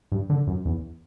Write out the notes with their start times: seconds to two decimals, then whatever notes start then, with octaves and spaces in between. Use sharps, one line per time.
0.12 G2
0.30 D3
0.47 F#2
0.65 E2